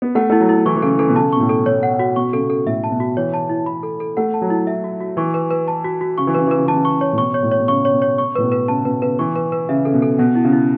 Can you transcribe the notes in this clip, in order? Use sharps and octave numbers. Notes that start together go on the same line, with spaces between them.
B3
A3 F#5
A3 E4
F#3
E4
E3 C#6
E3
C#3 A4
E3 A4
B2
C#3 A5
B2 C#6
A2
A4
B2 C#5
F#5
F#4
B2 C#6
C#3 A4
B2
A4
A2 E5
A5
B2
F#4
E3 C#5
A5
E4
B5
A4
A4
A3 F#5
A5
F#3
E4
E5
F#4
F#4
E3 C#6
B4
B4
A5
F#4
F#4
C#3 C#6
E3
C#3 B4
E3 B4
C#3
E3 A5
C#3
C#6
C#5
A2
B2 C#6
C#5
A2
C#5
B2
C#3 C#6
C#5
B2
C#5
C#6
A2 B4
B2
B4
C#3 A5
B2 B4
C#3 B4
E3 C#6
B4
B4
C#3 E5
C#3 A4
B2
A4
B2 F#5
E4
C#3
E4